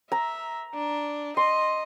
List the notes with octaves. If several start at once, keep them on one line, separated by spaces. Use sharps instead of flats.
E5 A#5
D4
D#5 C6